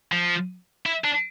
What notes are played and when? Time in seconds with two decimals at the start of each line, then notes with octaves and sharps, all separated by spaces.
0.12 F3
0.86 E4
1.04 D4